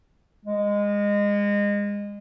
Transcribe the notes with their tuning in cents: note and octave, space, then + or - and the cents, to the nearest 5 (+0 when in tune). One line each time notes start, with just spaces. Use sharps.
G#3 -25